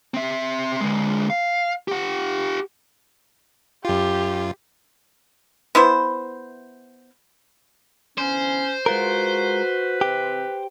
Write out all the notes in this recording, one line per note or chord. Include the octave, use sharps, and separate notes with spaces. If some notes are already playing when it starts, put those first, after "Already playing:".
C4 E5
D3 G#3
F5
G4 F#5
F#2 F4 G4
B3 E4 C5
D3 E3 B3 C#4 C5
G#3 F4 F#4 A#4 B4
C3 E3 C4 G4